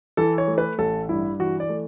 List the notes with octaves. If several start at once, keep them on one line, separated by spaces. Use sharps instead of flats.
E3 A4
C#5
A3
B4
A1 A4
G2 E4
E3 F#4
D5
A3